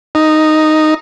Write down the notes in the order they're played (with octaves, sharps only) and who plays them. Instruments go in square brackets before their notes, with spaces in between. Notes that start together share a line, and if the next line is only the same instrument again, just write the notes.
[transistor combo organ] D#4